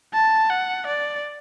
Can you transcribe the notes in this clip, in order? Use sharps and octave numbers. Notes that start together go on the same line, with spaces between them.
A5
F#5
D5